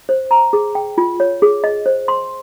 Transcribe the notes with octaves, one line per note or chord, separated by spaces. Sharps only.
C5
A#5
G#4
G5
F4
C#5
G#4
D#5
C5
C6